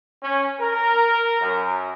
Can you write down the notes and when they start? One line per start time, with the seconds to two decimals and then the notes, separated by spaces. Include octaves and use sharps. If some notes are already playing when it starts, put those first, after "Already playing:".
0.23 C#4
0.61 A#4
1.41 F#2